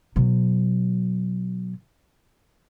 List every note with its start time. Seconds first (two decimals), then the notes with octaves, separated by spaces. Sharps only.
0.16 B2 F#3